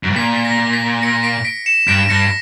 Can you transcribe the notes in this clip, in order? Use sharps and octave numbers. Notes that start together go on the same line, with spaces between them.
F#2
G2
A#2 B6
B6
A#6
B6
A#6 C#7
B6 D7
B6 D7
C#7 E7
G2 B6 D7
G2 A#6 C#7